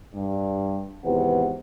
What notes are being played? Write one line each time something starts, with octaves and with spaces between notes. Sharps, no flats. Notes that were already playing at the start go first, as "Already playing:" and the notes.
G2
G#1 E2 C3 F#4 B4 F#5